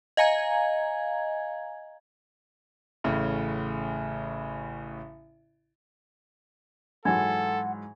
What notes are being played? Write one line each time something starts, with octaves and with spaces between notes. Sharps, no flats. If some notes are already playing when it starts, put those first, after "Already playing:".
D#5 F5 G#5 A#5 G#6
A1 A2 C#3
G#2 E3 F#3 A4 F#5 G#5 G#6